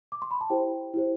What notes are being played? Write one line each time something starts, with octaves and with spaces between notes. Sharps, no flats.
D6
C6
B5
A5
E4 G4 C5 G5
E4 G4 C5